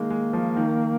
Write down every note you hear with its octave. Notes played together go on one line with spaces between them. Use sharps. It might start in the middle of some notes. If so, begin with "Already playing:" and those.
Already playing: D#3 G#3 A#3
G#3
F3
D#3